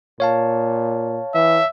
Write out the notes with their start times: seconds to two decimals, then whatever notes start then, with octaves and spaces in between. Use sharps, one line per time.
0.20 A#2 C#5 F5 A5
1.35 E3 E5